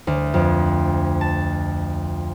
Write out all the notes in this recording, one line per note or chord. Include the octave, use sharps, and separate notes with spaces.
D2
F2
A5